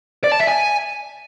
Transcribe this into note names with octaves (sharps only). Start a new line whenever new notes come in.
D5
A5
E5
G#5